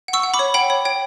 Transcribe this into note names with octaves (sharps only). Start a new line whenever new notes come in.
F#5
C#6 E6
F#5
B5 D6
C#5
F#5 G5 B5
C#5
C#5 G5